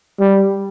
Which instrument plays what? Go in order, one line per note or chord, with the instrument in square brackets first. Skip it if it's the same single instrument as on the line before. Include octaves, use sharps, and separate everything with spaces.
[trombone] G3